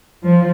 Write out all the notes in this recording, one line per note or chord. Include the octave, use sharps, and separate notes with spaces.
F3